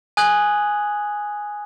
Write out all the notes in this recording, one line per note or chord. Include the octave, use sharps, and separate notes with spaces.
G#5 D#6 F#6 G#6 F#7